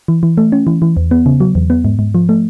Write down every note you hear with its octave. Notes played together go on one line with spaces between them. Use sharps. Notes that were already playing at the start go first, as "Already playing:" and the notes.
E3
E3
A3
C#4
E3
E3
E2
B3
C#3
F#3
E2
B3
G#2
G#2
F3
A3